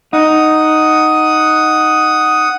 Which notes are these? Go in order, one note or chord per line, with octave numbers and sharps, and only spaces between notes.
D#4 F#5 D#6